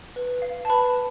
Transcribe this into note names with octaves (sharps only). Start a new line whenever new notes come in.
B4
F5
A5
B4 B5